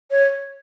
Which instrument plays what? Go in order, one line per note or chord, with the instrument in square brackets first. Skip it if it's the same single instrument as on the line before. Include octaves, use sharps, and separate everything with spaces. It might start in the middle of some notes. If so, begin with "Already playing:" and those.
[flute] C#5